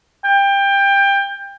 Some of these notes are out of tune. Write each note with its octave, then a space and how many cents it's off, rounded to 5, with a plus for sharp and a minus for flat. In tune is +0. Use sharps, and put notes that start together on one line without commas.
G5 +20